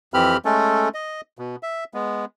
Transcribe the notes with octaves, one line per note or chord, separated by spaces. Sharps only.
F2 E3 C4 G4 B5 F6
G#3 A3 C#4 A4
D#5
B2
E5
G#3 B3